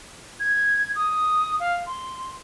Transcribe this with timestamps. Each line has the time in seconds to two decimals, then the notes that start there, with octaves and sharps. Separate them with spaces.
0.40 G#6
0.95 D#6
1.60 F5
1.86 C6